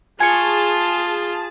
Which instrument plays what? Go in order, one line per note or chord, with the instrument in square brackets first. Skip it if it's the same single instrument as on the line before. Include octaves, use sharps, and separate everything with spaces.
[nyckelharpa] F4 [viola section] G#4 A5 [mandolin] G#5 C#6